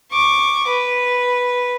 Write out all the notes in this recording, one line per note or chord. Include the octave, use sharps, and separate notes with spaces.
C#6 D6
B4